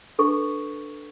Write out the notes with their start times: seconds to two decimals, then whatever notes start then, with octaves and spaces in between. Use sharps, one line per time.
0.19 D4 A4 B4 C#6